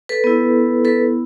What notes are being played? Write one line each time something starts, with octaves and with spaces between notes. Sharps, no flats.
A4 B4
B3 E4
A4 B4